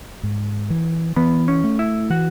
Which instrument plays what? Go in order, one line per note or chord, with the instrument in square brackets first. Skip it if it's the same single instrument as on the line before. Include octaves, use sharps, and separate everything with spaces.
[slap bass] G#2
E3
[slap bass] E3 [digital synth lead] B3
[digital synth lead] C#4
[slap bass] A3
[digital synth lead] E4
[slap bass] E3 [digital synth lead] F#4